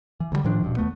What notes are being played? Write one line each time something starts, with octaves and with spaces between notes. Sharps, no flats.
E3
D2 D3 G3
A2 D#3 F3 D4
D#1 G2 B2
D#2 A3 B3